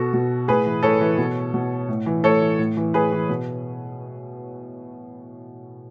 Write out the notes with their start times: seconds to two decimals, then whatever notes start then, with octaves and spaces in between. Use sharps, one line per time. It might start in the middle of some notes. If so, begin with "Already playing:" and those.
Already playing: B2 F#4 A4
0.13 B2
0.48 A2 G#4 B4
0.66 E3
0.83 A2 A4 C#5
1.01 E3
1.18 B2
1.54 B2
1.88 A2
2.06 E3
2.23 A2 A4 C#5
2.41 E3
2.59 A2
2.77 E3
2.94 A2 G#4 B4
3.12 E3
3.29 B2